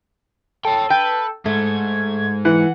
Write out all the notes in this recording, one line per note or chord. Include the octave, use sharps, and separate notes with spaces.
A4 C#5 G5
B4 G5
G#2 A3 G#6
E3 F#5